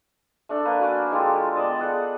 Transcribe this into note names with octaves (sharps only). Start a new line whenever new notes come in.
A3 D4 A4
A#3 B4
F#4 G#5 D6
G#3 F4 G4 A4
B3 D5 D#5 A5
G#4 A4 F#5